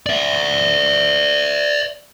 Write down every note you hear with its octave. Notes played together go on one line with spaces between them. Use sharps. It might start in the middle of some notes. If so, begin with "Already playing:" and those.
D5 E5